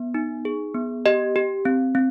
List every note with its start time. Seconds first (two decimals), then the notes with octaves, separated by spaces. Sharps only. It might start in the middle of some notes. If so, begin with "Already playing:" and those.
Already playing: B3
0.14 D#4
0.45 G#4
0.74 B3
1.06 G4 D#5
1.36 G4
1.65 C4
1.95 C4